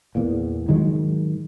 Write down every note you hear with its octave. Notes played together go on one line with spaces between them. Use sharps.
E2 A#2
G#2 D#3 F#3 G#3